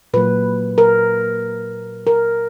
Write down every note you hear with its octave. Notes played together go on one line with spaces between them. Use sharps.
A#2 F#3 A#3 B4
A#4
A#4